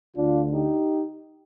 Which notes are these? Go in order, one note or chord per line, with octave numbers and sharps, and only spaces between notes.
D2 D3 D4 F4
D#4 G4